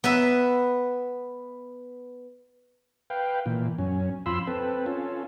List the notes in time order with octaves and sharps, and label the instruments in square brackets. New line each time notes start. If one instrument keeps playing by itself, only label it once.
[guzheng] B3 B4 E5
[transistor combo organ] B4 F5 G5
A#2 E3
F#2 C#4
F2 F4 B5 C6 E6
C4 A4 B4
C#4 F4 A4